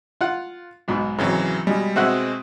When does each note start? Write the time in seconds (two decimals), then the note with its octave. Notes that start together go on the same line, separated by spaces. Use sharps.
0.21 F4 F#5
0.88 B1 G#2 B2
1.19 G#1 C#3 E3 F#3
1.67 B2 G3 G#3
1.96 B2 G#3 C4 F#4 E5 F#5